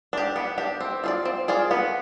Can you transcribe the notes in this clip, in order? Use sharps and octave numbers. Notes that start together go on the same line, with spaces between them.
D4 G4
B3
D4 G4
C4
F4 G#4 D5
C4
F4 G#4 D5
B3